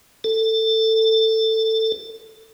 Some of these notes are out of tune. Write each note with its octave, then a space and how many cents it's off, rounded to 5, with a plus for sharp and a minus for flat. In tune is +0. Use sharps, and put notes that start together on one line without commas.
A4 +15